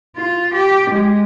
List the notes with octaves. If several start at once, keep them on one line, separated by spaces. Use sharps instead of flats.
F4
G4
G#3